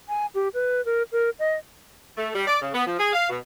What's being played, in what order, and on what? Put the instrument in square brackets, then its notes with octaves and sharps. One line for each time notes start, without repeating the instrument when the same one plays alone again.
[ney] G#5
G4
B4
A#4
A#4
D#5
[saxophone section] A3
G3
D5
C#3
B3
F3
G#4
F5
B2